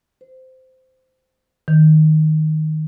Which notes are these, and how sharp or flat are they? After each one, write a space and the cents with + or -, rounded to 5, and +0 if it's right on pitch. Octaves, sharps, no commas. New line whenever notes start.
C5 -15
D#3 +0